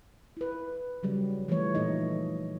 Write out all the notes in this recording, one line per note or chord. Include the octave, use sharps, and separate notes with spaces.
E4 B4
C#3 F#3 G3
E3 F3 G3 A3 C#5
A#2 A3 D#4 D#5